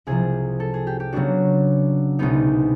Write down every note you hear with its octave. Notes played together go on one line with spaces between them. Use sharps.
C2 C3 F3 G#4
A4
G#4
G4
G4
C#3 F#3 B3 D4 F#4
C2 B2 G#3 B3 D#4